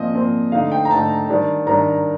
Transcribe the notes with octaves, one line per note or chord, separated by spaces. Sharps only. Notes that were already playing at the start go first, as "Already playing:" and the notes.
Already playing: A#2 F3 C4 D#5
A#2 F3 C4
D3 A3 D#4 F5
G5
A#5
D3 A3 D#4 A5
D#3 G3 D4
D#3 G3 D4 A#5